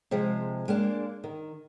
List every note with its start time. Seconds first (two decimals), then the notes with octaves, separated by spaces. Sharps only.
0.11 C3 F3 G#3
0.68 G#3 A#3 D4
1.24 D#3